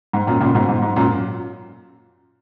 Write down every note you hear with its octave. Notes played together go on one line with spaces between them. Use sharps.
G#2
F#2 A#2
A#2 C#3
G#2 B2
G#2
G#2
F#2 A#2